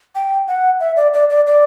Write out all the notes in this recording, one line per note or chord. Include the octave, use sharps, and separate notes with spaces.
G5
F#5
E5
D5
D5
D5
D5